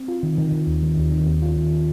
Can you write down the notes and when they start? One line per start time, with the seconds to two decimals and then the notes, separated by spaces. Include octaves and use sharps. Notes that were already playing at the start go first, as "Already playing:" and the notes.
Already playing: C4
0.08 F4
0.23 D#3
0.38 D#3
0.52 D#3
0.67 D#2
0.83 D#3
0.97 D#2
1.12 D#3
1.27 D#2
1.42 F4
1.57 D#2